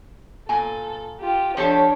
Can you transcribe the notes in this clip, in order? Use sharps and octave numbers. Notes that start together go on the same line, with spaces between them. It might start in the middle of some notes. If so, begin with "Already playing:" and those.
A#2 A4 G#5
F4 G4
F3 D4 G4 A4 C#5